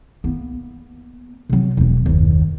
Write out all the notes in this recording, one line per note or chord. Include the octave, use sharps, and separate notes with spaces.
A#3 B3
C3 F#3
E1 E3
F#1 D#2